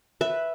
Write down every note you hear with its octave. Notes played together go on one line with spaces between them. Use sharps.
B4 E5